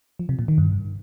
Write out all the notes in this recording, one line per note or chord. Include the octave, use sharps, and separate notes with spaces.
F3
C3
A#2
D#3
G2